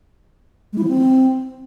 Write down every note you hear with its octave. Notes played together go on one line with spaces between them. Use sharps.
G#3
E4
F3
C4